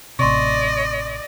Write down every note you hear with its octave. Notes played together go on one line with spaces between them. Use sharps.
A1 C3 D5 D#5 C6 C#6